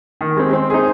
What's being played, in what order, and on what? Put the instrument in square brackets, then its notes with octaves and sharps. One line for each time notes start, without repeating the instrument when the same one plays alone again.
[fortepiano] D#3
G#3 C4
[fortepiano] C4 [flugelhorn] C5
[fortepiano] D#4 G#4